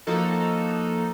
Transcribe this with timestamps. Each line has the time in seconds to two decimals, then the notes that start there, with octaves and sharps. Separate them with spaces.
0.07 F3 A#3 D#4 F#4 A4